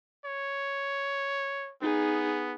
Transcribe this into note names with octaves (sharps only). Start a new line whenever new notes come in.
C#5
B3 D#4 G#4